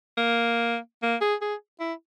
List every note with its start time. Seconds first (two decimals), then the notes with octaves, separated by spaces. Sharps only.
0.17 A#3
1.03 A#3
1.21 G#4
1.41 G#4
1.80 E4